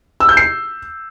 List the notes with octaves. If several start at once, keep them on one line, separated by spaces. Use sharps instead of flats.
E6
G6
C7